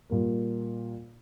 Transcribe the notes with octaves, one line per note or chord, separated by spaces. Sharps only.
A#2 G3 A#3